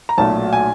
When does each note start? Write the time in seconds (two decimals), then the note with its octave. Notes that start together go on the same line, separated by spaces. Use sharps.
0.09 A#5
0.18 B1 A#2 F#3 A3 A5
0.53 G#5